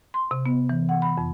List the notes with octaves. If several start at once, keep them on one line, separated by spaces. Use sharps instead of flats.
C6
C3
B3
E3
F#5
B5
F2